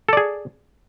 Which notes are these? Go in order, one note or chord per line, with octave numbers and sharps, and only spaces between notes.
G#4 A4 D5